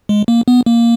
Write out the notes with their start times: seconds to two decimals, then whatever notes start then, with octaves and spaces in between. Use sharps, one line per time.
0.09 G#3
0.28 A#3
0.48 B3
0.66 A#3